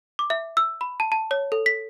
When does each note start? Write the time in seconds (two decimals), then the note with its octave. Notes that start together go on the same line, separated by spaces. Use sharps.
0.19 D6
0.30 E5
0.57 E6
0.81 B5
1.00 A5
1.12 A5
1.31 C#5
1.52 A4
1.66 B6